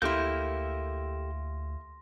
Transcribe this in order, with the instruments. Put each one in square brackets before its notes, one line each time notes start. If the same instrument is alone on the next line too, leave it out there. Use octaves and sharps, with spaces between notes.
[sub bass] D2 [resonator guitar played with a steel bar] A#3 E4 [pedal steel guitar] G4 A4 G6 [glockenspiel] C6 A#6